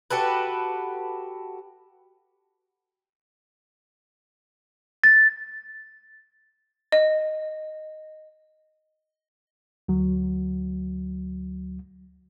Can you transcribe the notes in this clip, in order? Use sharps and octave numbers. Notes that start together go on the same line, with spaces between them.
F#4 G4 A4 B4
A6
D#5
D2 F#3